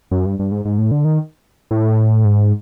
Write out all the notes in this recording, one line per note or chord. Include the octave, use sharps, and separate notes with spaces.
F#2
G2
G2
G#2
G#2
A2
D3
D#3
A2
G#2